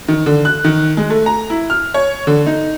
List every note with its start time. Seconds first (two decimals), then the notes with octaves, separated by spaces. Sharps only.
0.08 D#3
0.26 D3
0.45 F#6
0.64 D#3
0.97 G#3
1.10 A3
1.26 A#5
1.50 E4
1.70 F6
1.94 C#5
2.27 D3
2.46 D#4